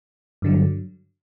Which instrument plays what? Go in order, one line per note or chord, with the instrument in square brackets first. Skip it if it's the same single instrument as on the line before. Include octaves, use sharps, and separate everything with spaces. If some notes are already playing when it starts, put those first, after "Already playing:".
[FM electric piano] G2 D3 F#3